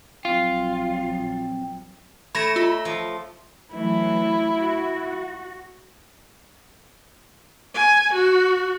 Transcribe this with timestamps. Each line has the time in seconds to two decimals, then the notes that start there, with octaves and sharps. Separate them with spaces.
0.25 A#1 F3 F#3 C4 F4
2.35 A3 C#5 B5 A#6 E7
2.56 F4 B5
2.85 F3
3.74 E3 F#3 A3 E4
4.57 F#4
7.74 G#5
8.13 F#4